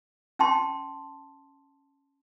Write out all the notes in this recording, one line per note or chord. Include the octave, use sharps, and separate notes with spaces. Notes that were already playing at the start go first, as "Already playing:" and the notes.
C#4 G5 A5 C6